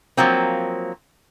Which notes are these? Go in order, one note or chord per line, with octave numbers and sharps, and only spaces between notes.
F3 F#3 A#3 C4